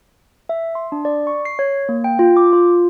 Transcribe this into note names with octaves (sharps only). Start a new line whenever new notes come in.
E5
C6
D4
D5
C#6
C7
C#5
A#3
G5
F4
D6
F4